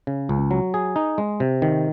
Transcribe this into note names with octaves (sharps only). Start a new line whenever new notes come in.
C#3
C#2
F#3
G#4
D#4
G#3
C3
D#3